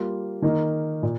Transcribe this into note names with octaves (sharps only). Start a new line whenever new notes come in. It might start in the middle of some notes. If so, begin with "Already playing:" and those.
Already playing: G3 A#3 F4
D#3 A#3 D#4
A#2